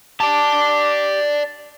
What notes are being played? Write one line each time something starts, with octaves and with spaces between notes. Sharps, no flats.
G4 D5 A5